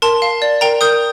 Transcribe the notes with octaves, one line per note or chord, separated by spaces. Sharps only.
A#4 A5 C6
F5
D5
A#4 G5 A#5
A#4 D#6 G6